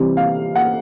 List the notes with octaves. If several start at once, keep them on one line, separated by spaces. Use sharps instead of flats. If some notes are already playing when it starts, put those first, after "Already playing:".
Already playing: C3 E3 G3 C4
F5
F#5